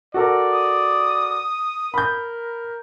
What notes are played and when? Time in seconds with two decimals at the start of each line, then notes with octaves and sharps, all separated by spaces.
0.14 F#4 A4 A#4 D5
0.53 D#6
1.94 A#4 B5 G6